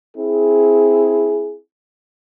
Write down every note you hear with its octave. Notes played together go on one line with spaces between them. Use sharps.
C4 E4 G#4